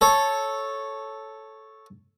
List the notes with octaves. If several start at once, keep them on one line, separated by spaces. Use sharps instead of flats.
A4 C#5